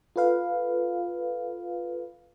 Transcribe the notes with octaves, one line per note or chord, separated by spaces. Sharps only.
F4 A4 B4 F5